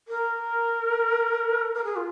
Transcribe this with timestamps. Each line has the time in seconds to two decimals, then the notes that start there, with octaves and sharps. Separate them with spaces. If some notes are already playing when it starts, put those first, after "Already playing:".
0.08 A#4
1.75 A#4
1.84 G#4
1.96 F4